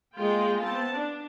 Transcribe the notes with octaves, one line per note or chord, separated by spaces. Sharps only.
G#3 A#3 F4 G5
B3 C4 A5
D4